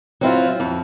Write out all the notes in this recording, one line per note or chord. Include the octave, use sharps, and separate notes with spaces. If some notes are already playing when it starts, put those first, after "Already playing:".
F#3 C4 E4 F4
F2